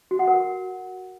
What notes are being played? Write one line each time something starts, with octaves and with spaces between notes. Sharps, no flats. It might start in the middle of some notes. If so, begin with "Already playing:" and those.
F#4
F#5
A#4